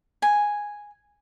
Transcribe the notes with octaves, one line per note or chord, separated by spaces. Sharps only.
G#5